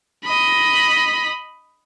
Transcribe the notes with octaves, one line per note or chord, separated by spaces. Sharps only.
D#5 B5